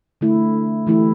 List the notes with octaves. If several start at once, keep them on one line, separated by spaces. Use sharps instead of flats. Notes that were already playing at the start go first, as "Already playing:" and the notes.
D3 A3 E4
E3 A3 E4 G4